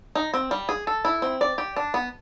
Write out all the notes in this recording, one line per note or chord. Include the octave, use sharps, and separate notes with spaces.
D#4
C4
G3
G#4
A4
E4
C4
D5
G4
D4
B3